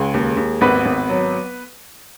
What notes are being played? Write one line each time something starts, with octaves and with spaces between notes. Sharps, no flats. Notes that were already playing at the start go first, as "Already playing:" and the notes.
Already playing: C#2 G#3 G#4
D#2
D#2
G#1 B3 B4
G#1
F#3